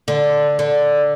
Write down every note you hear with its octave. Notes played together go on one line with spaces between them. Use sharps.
D3
D3